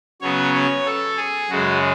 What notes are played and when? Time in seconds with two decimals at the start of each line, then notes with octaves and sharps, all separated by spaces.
0.21 C#3 F#3 B3 C#5
0.54 C#5
0.86 A4
1.17 G#4
1.50 F#2 C#3 G#3 F#4